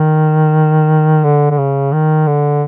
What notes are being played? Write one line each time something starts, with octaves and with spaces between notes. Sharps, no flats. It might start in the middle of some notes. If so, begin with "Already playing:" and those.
Already playing: D#3
D3
D3
C#3
D#3
D3